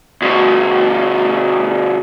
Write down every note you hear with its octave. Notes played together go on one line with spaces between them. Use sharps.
D2 B2